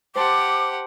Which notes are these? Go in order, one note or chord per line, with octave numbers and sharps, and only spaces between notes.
G4 C5 F#5 A5 C6 D6